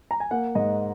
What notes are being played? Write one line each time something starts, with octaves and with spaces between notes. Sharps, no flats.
A#5
G#5
A#3 F#5
G#2 D#5